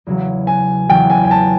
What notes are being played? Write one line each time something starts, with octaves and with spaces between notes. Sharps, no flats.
E2 C#3 F#3
G#5
E2 C#3 F#3 G5
G#5
G#5
A5